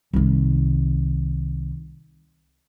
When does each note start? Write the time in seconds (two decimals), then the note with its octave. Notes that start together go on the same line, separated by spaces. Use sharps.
0.13 C2 D#3